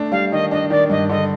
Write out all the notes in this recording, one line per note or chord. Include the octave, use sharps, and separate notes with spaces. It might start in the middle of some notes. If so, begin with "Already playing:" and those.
Already playing: A3 D4
G3 F5
D#3 D#5
D4 D#5
D#3 D5
G2 D#5
D3 D#5